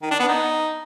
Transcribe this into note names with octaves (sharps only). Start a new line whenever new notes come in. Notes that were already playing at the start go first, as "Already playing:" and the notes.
D#3
D4
B3
D#4